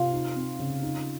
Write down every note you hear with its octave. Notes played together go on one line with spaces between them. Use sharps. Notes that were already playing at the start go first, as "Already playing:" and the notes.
Already playing: C3 F4 F5
D#4
C4
C#3
D#4